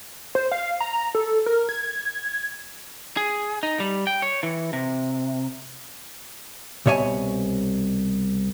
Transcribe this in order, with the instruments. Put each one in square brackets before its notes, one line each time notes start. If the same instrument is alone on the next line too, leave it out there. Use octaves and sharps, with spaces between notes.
[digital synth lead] C5
F5
A#5
A4
A#4
G#6
[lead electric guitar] G#4
D#4
G3
G5
C#5
E3
C3
[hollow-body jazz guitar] C2 B2 C#5 E5 G#5